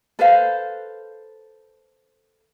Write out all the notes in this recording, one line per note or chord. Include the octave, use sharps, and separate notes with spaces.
A4 B4 C5 F5